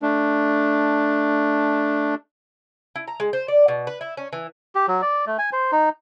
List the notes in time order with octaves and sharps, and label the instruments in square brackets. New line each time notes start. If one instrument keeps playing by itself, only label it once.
[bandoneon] A3 D4
[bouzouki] E4
A#5
G#3
C5
D5
B2
B4
E4
C#4
E3
[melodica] G4
F#3
D5
A3
G#5
C5
D#4